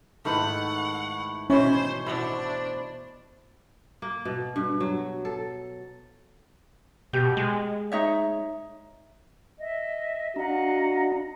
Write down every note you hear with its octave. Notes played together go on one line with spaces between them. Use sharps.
G#2 D#3 A3 E4 B4 F#5 G5
B2 D#3 E3 C#4 C5 C#5 B5
B2 D4 E4 C5 E5 F#5
A#3
B2
G2
F#3
A4
B2 G4
G#3
D#4 C#5 E5
D#5 E5
D4 F#4 D#5 F5 F#5 A#5